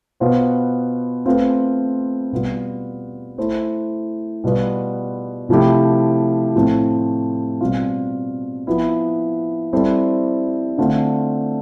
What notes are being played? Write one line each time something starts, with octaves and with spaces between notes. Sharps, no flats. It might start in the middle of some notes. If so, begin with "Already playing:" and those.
B2 B3 F4 C5
A3 C4 F4 B4
B2 G3 B3 F4
A3 E4 A4 C5
B2 G3 B3 F4
C3 F3 A3 E4 G4
A2 F3 A3 C4
B2 G3 C4 F4
F3 B3 E4
G3 C4 E4 A4 C5
D3 A3 C4 F4